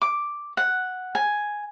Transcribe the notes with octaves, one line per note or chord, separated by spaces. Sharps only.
D6
F#5
G#5